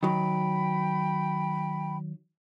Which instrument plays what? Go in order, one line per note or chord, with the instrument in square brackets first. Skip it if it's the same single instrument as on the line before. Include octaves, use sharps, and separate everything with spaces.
[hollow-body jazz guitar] D#3 F#3 [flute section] G5 B5